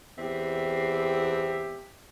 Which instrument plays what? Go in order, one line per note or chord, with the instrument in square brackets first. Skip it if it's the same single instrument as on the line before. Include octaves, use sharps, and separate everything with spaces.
[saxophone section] E2 C4 G4 E5